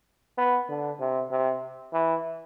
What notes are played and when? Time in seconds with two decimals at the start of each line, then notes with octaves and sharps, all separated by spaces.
0.38 B3
0.69 D3
1.00 C3
1.31 C3
1.93 E3